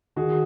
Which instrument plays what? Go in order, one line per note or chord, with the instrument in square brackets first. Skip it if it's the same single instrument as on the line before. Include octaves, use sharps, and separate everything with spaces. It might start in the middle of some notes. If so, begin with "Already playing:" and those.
[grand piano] D#3 F#4 G#4